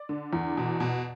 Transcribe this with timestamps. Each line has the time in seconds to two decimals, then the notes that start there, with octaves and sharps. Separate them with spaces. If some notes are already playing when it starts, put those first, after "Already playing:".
Already playing: D5
0.09 D3
0.33 E2
0.57 B2
0.80 B2